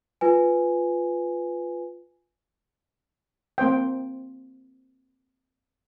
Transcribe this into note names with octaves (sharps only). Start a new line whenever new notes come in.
F4 B4 G#5
A#3 C4 C5 G5